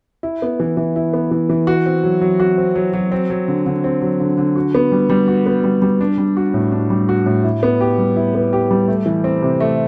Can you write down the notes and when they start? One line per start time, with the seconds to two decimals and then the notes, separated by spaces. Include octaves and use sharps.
0.23 E4
0.42 B3
0.60 E3
0.77 E3
0.96 E4
1.13 B3
1.31 E3
1.49 E3
1.67 F#4
1.86 C4
2.04 F#3
2.21 F#3
2.40 F#4
2.58 C4
2.75 F#3
2.93 F#3
3.12 C4
3.30 F#3
3.48 D3
3.66 D3
3.84 C4
4.02 F#3
4.20 D3
4.37 D3
4.56 F#4
4.75 B3
4.92 G3
5.10 G3
5.28 F#4
5.46 B3
5.64 G3
5.82 G3
6.01 D4
6.18 G3
6.37 F#4
6.54 A2
6.72 D4
6.90 G3
7.09 F#4
7.26 A2
7.44 E4
7.63 B3
7.81 G4
7.98 G3
8.16 E4
8.35 B3
8.53 G4
8.71 G3
8.88 A3
9.06 E3
9.24 C4
9.42 C3
9.60 A3